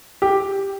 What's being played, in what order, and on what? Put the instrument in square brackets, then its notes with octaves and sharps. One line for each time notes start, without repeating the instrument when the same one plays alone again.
[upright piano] G4